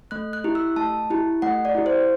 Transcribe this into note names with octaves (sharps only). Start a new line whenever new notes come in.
A3 F#6
F#6
E4 G4
E6
A3 A5
E4 G4
A3 F#5
D5
E4 G4
C5